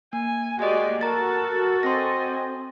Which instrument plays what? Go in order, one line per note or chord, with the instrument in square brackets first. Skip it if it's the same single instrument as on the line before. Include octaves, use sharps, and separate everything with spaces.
[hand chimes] A#3 [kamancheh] G#5
[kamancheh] G#3 D5 [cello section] A#3 F#4 G4 [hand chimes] D#5 G#5
[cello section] F#4 A4 [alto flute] A#4 [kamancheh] A5 [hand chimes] A#5 A6
[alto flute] C4 [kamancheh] D#5 G#5 [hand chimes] C6 A#6